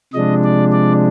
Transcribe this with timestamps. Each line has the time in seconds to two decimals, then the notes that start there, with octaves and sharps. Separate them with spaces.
0.13 C3 F3 G#3 D4 D#5
0.44 D5
0.72 D5